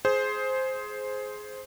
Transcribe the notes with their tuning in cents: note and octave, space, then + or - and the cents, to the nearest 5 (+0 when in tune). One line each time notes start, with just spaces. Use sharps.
G#4 +15 C5 +0